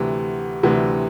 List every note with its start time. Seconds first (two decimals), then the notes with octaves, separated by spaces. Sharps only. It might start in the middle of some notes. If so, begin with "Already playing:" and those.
Already playing: D2 C3 E3
0.63 D2 C3 E3